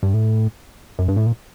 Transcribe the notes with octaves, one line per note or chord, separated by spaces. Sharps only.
G2
A2
F#2
G2
A2
A#2